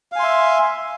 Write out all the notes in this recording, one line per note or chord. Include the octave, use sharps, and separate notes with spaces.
E5 F5 G#5 C6